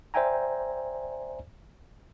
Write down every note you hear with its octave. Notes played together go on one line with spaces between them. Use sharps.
C5 D5 E5 G5 G#5 A#5